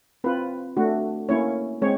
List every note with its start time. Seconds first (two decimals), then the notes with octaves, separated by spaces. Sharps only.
0.24 C4 F4 B4
0.77 A3 D4 F#4
1.29 A#3 C#4 E4 C#5
1.82 G#3 C4 C#5